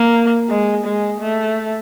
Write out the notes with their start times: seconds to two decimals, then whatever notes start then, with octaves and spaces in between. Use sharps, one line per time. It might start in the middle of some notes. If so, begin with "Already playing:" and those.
Already playing: A#3
0.49 G#3
0.85 G#3
1.21 A3